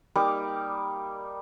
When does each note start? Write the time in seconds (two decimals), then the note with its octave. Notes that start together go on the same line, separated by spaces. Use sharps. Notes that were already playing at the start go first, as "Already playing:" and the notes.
0.15 G3 A#3 D#4 D6